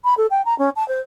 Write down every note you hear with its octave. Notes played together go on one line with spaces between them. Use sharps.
B5
A4
G5
A#5
C#4
A5
C5